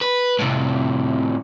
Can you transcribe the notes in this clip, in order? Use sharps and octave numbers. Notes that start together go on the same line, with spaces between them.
B4
A2 C3